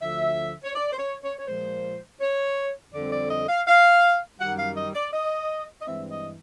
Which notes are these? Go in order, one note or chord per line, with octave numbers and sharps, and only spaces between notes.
D2 D3 F3 E5
C#5
D5
C5
C#5
C#5
C#5
A#2 F3 G#3 C5
C#5
F2 D3 G3 C4 D5
D5
D#5
F5
F5
F#2 D#3 G3 F#5
F5
D#5
D5
D#5
D#5
G2 E3 G#3 C4 E5
D#5